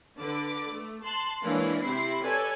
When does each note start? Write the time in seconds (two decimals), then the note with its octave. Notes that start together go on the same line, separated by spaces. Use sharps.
0.18 D3 B4 D6
0.74 A3
1.02 A5 C6 F#6
1.43 E3 G#3 A#3 C#4 D4
1.81 C3 C4 E4 C7
2.24 A4 B4 C#5 D5 G#5